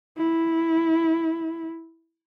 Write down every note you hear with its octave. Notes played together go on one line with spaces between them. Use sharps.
E4